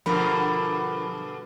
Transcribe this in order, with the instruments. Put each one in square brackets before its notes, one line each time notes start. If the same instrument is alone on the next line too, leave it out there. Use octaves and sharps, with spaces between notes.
[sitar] G2 B2 D3 [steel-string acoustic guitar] F3 A#4 F#5 [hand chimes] B5